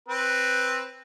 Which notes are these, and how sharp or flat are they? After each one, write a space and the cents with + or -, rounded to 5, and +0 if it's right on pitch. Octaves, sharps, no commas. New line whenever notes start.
C4 +10 B4 +0